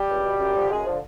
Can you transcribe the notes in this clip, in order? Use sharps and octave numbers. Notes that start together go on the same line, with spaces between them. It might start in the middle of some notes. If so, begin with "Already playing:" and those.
Already playing: G3 G4
C#2
B2
F#2
D3 F3
F#2 G#3 G#4
D3 F3